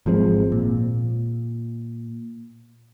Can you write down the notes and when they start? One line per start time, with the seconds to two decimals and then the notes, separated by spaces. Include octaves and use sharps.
0.06 G#1 F3 G#3 C4
0.52 A#2